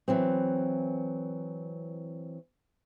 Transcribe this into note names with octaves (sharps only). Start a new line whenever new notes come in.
E3 F#3 C4